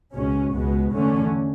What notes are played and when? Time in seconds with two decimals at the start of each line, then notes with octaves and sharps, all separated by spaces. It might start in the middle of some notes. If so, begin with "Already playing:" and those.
0.14 C#2 B2 G#3 C#4
0.53 C#2 B2 G#3 B3
0.91 E2 D3 A3 C#4